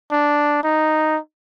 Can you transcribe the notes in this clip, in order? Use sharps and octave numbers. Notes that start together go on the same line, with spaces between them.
D4
D#4